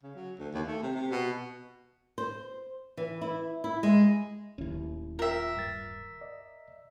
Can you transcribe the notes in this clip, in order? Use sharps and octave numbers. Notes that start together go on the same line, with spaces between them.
C#3
F#3
D2
D#2
A3
C3
C3
B2
C5
E3
E4
E4
G#3
D1 D#2 C#4 E4
F4 A#4 E5 G5
G2 A6
D5 D#5